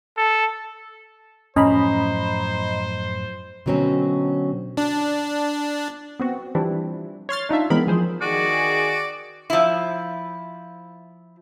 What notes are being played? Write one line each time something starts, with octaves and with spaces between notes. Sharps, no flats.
A4
F#2 A2 F3 C#4 C5 D#5 A#5 B5
B2 D3 F#3 C4 C#4
D4
B3 C4 F#4
E3 F3 G3 C4 D4 E4
C#5 C6 F6 A6
D4 D#4 F4 E5
E3 G#3 B3 C4 A#4 B5
F3 G#4 C5
D#3 F#4 G#4 D5
F3 E4